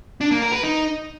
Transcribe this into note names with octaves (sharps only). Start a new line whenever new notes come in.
D4
A#3
A#4
B4
D#4